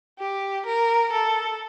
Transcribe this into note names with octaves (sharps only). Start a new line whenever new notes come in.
G4
A#4
A4